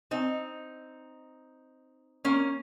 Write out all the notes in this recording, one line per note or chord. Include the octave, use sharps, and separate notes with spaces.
C4 D#4
A#3 C#4